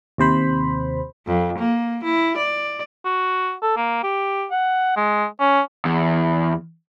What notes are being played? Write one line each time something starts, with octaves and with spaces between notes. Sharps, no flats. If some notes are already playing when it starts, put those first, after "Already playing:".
D#2 C3 C5 B5
F2
A#3
E4
D5
F#4
A4
A#3
G4
F#5
G#3
C#4
E2